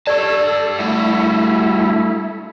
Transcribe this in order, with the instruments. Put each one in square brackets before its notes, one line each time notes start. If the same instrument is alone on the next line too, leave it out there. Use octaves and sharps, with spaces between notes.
[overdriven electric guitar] G4 A5 [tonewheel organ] A4 [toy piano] D5 C#6
[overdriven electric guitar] G2 F#4 [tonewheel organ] A3 E4